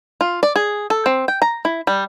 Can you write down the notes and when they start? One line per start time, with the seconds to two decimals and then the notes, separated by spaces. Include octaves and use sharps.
0.21 F4
0.43 D5
0.56 G#4
0.90 A4
1.06 C4
1.28 G5
1.42 A#5
1.65 E4
1.87 G3